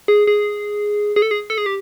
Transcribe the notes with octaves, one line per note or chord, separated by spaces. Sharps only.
G#4
G#4
G#4
A4
G#4
A4
G#4
G4